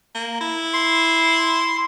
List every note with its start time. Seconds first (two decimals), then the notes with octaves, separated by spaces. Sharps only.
0.15 A#3
0.41 E4
0.74 C6